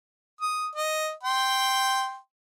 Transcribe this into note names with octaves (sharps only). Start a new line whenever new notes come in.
D#6
D#5
G5 C6